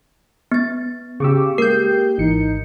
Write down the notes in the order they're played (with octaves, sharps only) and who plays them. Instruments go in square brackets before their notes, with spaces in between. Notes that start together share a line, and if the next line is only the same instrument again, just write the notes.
[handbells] B3 A6
[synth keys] C#3 G4 [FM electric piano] C#6 D6 E6
[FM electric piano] G#3 A#3 [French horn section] G4 [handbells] A#4 [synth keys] G6 C7
[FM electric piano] G#1 E3 C#7 [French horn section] D#4